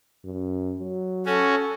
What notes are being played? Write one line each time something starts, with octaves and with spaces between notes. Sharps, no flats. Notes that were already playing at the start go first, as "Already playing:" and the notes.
F#2
F#3
C#4 F#4 A4